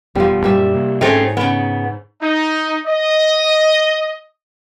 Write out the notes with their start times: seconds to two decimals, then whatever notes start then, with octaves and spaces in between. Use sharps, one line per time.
0.15 E1 F2 F3 G3 B3
0.44 F#2 A#2 G3 D5 E5
0.75 C3 A#3
1.01 G#2 A3 C4 C#4 G#4 A#4 C#5
1.37 C#3 B3
2.21 D#4
2.86 D#5